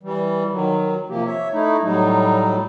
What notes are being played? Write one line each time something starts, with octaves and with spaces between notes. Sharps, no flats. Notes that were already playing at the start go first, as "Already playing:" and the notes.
E3 G3
D#3 F#3
C3 F3 A#3 G4
C#5 E5
A3 D#4 E4
A2 F#3 G3 D#4